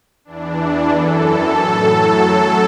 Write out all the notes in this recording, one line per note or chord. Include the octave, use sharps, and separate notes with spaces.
E2 E3 D4
F#2 E3 A4
A2 F#3 A4
F#2 F#3 A4